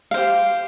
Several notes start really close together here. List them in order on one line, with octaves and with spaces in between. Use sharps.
F5 C5 G4